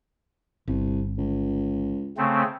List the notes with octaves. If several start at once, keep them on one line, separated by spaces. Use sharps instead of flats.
G1 C2
C#2
C#3 A3 C4